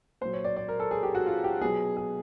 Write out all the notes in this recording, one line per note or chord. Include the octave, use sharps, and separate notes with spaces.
A#2 F#3 C5
C#5
D5
D5
A#4
A4
G#4
G4
F#4
F4
G4
B2 F#3 G#4
G#4